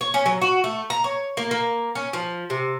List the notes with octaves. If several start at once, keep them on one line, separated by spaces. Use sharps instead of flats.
C#5
C#4
F#3
F#4
A3
A#5
C#5
A#3
A#3
C#4
F3
C3